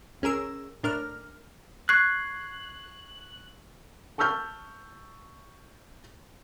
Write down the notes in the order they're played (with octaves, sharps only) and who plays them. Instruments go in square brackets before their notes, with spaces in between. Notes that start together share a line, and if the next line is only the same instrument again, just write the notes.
[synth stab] C#2 C#4 G#4 A#4 E6
A2 D4 A#4 F6
[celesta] C#6 G#6 C7 [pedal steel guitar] F#6
[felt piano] A5 C#6 E6 F6 G6